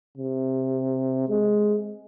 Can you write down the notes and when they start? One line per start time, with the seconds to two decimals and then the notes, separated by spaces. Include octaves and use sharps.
0.18 C3
1.29 G#3